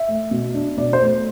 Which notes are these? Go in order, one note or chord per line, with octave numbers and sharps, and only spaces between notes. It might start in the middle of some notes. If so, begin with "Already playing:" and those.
Already playing: E5
A3
B2
D4
B2 D5
C5
A3